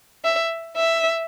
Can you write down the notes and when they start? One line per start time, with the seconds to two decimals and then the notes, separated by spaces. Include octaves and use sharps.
0.24 E5
0.77 E5